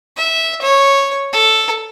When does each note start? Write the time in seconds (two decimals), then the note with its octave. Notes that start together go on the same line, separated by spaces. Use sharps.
0.17 E5
0.62 C#5
1.33 A4